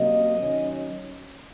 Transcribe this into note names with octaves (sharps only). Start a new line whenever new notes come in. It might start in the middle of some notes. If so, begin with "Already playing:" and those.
Already playing: C3 F#3 A#3 C#4 D#5
D#3 F#3 C#4